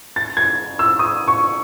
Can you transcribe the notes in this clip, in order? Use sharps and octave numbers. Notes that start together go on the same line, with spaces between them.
A6
G#6
E6
D#6
C#6